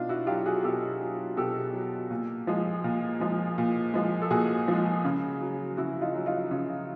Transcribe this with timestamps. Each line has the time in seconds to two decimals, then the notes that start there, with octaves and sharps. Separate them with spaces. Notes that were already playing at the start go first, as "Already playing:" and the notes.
Already playing: B2 D4 D#4 F4
0.09 E4 F#4
0.27 F#3 F4 G4
0.46 F#4 G#4
0.64 B2 G4 A4
1.01 F#3
1.37 B2 G4 A4
1.74 F#3
2.11 A#2
2.47 F3 G#3
2.84 A#2
3.20 F3 G#3
3.58 A#2
3.94 F3 G#3
4.22 A4
4.31 A#2 F#4 G#4
4.68 F3 G#3
5.05 C#3
5.41 F#3
5.77 C#3 E4 F#4
6.01 D#4 F4
6.14 F#3
6.26 D#4 F4
6.51 C#3